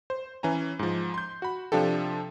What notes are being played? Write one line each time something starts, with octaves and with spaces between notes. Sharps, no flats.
C5
E3 C#4 G#5 A#5
G#2 F3
C6 G6
F#4 B5
C3 F3 D4 F4 G4 A4